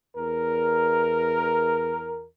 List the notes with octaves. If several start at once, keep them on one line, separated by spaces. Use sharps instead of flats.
E2 A#4